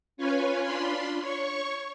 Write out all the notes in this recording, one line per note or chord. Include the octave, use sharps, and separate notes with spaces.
C#4 F4 B4 C#5 G#5
D4 F4 B5 C6
C#5 C#6